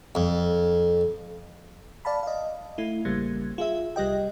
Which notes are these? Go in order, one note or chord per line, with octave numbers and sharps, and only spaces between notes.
F2
D5 F5 A5 B5
D#5 F5
A3 E4
A1 C#3 G3 A#3 G#6
F4 G#4 E5
C2 G3 G4 D#5 G5